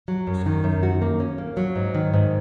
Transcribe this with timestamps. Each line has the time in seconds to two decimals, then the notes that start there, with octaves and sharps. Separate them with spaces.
0.08 F#3
0.27 F#2
0.46 D#3
0.64 F#2
0.83 F#4
1.02 A#3
1.20 C#4
1.38 A#3
1.57 F#3
1.76 G#2
1.95 D#3
2.14 G#2